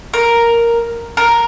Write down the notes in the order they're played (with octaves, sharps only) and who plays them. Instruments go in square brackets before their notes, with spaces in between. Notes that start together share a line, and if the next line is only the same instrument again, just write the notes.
[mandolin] A#4
A#4